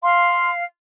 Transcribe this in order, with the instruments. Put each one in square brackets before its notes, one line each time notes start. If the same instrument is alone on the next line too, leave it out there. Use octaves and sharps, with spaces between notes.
[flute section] F5 [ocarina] C6